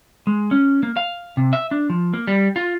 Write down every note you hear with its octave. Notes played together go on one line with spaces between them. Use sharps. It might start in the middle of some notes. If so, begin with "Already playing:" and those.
G#3
C#4
A#3
F5
C3
E5
D4
F3
A#3
G3
F4